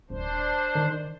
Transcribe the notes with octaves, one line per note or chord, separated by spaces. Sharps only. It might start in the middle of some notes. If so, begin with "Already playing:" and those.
D#1 D4 C5
D#3